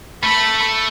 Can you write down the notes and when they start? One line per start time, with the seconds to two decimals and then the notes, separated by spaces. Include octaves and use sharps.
0.24 A3 A4 B5